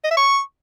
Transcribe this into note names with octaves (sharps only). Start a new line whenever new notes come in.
D#5
E5
C#6